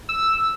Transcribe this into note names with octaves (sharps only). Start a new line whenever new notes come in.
E6